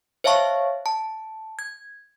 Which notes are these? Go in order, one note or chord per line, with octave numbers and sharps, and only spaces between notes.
C5 C#5 E5 F5 A5 C#6
A5
G#6